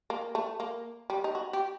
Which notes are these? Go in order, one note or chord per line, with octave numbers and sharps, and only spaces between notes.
A#3
A3
A#3
G3
D#4
F#4
G4